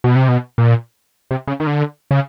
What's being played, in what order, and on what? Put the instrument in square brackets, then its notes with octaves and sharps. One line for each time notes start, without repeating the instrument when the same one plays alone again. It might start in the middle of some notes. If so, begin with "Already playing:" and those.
[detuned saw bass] B2
C3
B2
A#2
C3
C#3
D#3
D3
C#3